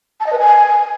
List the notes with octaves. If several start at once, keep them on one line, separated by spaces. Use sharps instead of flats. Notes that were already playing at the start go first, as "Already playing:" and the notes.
A5
D#5
B4
G#5